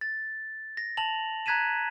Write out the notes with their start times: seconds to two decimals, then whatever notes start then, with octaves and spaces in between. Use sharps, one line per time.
0.01 A6
0.77 A#6
0.97 A5 F7 F#7
1.46 A#5 F#6 G#6 B6 D#7 E7